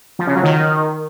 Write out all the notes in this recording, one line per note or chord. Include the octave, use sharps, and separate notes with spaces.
F3
C#3
F#3
D#3